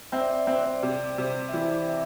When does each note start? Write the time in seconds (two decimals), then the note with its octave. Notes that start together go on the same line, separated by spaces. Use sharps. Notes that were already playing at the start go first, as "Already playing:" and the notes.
0.12 C4 E5
0.21 D5
0.30 E5
0.47 C4 D5
0.56 C5
0.66 D5
0.83 C3
1.18 C3
1.49 E5
1.53 E3 D5
1.89 E5